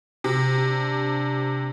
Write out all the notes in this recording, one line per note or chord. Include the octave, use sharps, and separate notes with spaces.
C3
D4